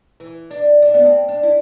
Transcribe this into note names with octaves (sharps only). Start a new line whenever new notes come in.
E3
D4
D4
B3
C4
D4
E4